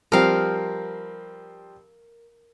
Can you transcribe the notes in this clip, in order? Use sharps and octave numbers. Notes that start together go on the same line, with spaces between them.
F3 G3 C4 A#4 F5